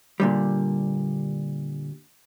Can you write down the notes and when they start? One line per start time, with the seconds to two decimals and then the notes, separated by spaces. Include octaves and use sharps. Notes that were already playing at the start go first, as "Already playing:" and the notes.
0.20 A#2 D3 G3